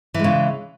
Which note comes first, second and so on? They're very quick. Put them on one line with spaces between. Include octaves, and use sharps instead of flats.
E3 G#3 C#3